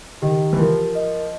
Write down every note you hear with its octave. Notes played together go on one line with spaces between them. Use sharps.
D#3 G4
E3
F3 A#4
D#5